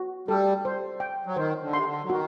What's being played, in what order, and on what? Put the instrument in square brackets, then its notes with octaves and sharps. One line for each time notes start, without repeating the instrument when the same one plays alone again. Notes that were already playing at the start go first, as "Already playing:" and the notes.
Already playing: [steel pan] F#4
[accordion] G3 [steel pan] A4
[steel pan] C5
G5
[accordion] F#3
[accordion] D#3 [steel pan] C5
[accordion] D3
[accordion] C3 [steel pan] C6
[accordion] D3
F#3
[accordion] D#3 [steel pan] F#4